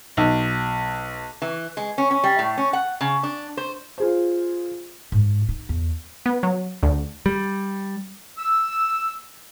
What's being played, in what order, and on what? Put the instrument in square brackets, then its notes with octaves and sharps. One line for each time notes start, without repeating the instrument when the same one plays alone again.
[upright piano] B1
[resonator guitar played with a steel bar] E3
G#3
C#4
C#4
G3
A2
C#4
F#5
C#3
D4
C5
[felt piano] F4 G#4 C5
[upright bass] G#2
D#4
E2
[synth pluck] B3
F#3
D2
[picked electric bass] G3
[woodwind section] E6